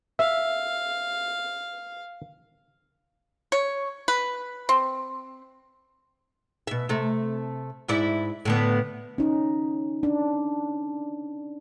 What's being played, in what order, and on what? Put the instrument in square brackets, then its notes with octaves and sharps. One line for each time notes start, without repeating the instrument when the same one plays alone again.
[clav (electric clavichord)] E5 [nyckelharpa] F5
[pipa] C#5
B4
C4
[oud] B2 E5
C3 A3
G#2 E4 D5
A2 D3 B3
[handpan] C#4 D#4
D4